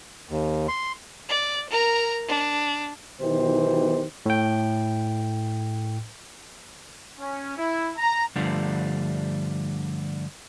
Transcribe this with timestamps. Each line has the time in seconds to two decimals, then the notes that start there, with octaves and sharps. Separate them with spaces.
0.29 D#2
0.68 C6
1.29 D5
1.70 A#4 A#5
2.28 D4
3.21 B1 B2 D#3 E3 G4 C5
4.26 A2 G5
7.19 C#4
7.57 E4
7.97 A#5
8.36 G2 D3 F3 G3 A3 D4